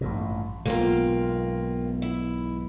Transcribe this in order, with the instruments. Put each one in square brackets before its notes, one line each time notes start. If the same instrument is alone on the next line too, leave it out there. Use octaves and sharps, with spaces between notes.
[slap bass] A1 G2 A#2
[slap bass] B1 G#2 B2 [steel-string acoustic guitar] A#3 C4 F4
[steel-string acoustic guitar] E4